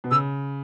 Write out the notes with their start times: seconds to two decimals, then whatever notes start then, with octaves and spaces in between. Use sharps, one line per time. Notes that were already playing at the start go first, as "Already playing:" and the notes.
0.04 B2
0.11 C#3 E6